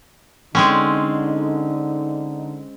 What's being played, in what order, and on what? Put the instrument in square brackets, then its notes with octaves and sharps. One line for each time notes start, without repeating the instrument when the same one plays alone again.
[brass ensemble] D3 D#4 [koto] G#3 C4 C#4